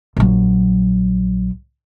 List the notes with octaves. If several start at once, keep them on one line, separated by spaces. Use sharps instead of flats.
A#1 F#3